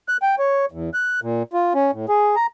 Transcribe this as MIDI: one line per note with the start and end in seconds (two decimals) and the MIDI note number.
0.08 0.17 90
0.22 0.35 79
0.39 0.66 73
0.72 0.90 40
0.94 1.20 90
1.22 1.43 46
1.53 1.73 65
1.75 1.91 61
1.93 2.06 45
2.09 2.36 68
2.36 2.46 82